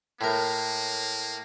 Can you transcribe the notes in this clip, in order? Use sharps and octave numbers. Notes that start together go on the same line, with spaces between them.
A2 A#3 A#4